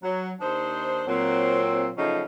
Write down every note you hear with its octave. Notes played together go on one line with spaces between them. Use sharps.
F#3
D#2 D4 D#4 C5
A#2 F#3 C4
C#3 F3 F#3 A3 C#4 D#4